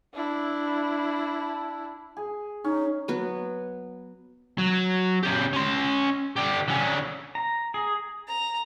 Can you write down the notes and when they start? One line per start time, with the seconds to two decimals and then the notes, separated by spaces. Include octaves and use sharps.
0.14 D4 E4
2.17 G#4
2.64 C#4 D#4
3.08 F#3 B3 B4
4.58 F#3
5.23 C#3 G4
5.53 C#4 C6
6.36 D3 G4
6.68 D3 C#4
7.35 A#5
7.74 G#4
8.28 A#5